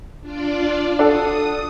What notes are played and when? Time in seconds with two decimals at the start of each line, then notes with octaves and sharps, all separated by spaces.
0.21 D4 F4 D5
0.99 D4 F#4 A4 D#6